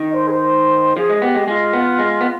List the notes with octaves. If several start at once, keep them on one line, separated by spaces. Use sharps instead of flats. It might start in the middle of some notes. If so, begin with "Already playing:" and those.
Already playing: D#3
D#5
C5
G#4
C5
F3 G#4
G#3
B3 G4
G#3
G#3 F4
B3
G#3
B3